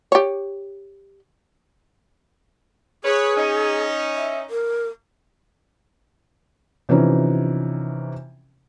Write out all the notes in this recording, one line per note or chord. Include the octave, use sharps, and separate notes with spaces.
G4 C#5
G#4 B4 C#5
C#4 D#4
E5
A#4
C3 E3 F3 C#4 D#4